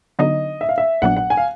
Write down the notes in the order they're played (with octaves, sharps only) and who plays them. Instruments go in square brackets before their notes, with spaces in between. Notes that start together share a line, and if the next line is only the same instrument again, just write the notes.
[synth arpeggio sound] D3 F#3 B3 D#4 [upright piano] D#5
[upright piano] E5
F5
E5
[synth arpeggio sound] A#1 A#2 F#3 B3 D4 [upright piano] F#5
[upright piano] F#5
G#5
F5